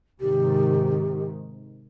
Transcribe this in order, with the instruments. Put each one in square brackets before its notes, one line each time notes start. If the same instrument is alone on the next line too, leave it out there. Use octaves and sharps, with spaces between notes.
[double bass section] G#2 C3 D#3 [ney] G4